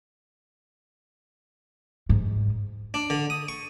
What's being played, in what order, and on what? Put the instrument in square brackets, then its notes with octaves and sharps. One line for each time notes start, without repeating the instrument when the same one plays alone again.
[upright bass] G#2
[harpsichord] D4
D3
D#6
C#6